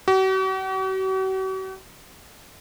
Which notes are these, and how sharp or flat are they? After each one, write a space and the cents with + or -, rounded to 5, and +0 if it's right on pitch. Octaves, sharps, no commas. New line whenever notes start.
F#4 +45